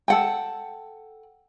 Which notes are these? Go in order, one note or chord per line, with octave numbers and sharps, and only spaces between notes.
A4 F#5 G5